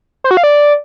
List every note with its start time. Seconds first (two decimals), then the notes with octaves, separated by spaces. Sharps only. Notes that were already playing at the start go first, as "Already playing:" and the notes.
0.24 C5
0.31 F#4
0.37 F5
0.43 D5